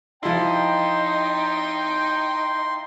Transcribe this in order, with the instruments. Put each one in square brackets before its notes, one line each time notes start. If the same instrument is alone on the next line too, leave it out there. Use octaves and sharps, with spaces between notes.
[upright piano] F3 E4 [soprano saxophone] D#4 [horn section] G5 [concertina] C6